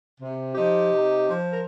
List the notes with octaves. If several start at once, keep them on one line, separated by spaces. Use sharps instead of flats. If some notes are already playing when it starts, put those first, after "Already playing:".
C3
F3 D#4 G4
C3
F3
A#4